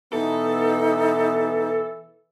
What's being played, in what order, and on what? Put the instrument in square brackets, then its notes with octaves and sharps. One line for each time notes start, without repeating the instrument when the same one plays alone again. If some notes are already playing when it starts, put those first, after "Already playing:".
[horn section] B2 B3 [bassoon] E3 [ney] D#4 [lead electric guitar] A4